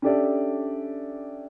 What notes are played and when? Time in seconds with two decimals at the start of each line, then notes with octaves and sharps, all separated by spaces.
0.02 C#4 D4 G4 A4 D5 E5